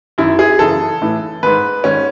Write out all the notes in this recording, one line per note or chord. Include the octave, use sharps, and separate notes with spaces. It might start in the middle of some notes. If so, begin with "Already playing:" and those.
F#2 D#3 E4
G#4
F#2 C#3 E3 A4
A2 E3
G#2 D#3 B4
G#2 D#3 C#4